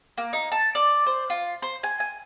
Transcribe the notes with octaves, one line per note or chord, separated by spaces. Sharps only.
A#3
D#4
A5
D5
C5
F4
C5
G#5
G#5